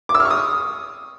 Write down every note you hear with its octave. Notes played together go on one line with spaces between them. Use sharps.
D6
E6
F6
C#6
D#6